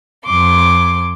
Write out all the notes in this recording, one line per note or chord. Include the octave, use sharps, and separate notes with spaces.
F2 C6 D6